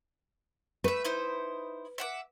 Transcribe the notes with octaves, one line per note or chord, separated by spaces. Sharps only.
A3 B4 E5
D#4 E4 C5
E5 F#5 D6